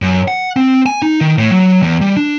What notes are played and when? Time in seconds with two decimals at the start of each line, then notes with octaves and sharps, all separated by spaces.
0.02 F#2
0.28 F#5
0.56 C4
0.86 G#5
1.02 D#4
1.21 D#3
1.38 A2
1.51 F#3
1.82 E2
2.01 G3
2.17 D4